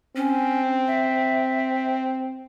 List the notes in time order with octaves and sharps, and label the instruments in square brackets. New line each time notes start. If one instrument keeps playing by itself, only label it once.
[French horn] C4 [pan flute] C#4
[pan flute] E5